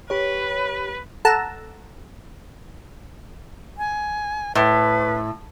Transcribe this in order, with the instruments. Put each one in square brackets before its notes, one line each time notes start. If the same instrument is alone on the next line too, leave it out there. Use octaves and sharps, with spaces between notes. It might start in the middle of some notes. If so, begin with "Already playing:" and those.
[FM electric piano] G4 C#5 [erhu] B4
[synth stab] A4 F#5 A5 A#5 E6
[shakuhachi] G#5
[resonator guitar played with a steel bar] A2 [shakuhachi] B4